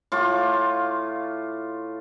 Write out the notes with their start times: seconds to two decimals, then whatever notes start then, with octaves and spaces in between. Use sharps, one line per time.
0.12 A2 F4 C#6 D6